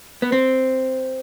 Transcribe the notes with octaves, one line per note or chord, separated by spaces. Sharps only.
B3
C4